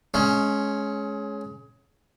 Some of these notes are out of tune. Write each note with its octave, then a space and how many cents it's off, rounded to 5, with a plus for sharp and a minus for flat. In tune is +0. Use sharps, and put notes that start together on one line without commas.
G#3 +25 C#4 +0